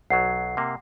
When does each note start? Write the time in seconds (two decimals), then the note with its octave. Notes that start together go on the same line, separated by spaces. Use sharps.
0.10 B1 F#3 F#5 C7
0.57 C3 A#3